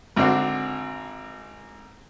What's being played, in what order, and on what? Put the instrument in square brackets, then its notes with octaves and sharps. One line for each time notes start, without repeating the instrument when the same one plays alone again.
[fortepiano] G#1 D3 C4 F#4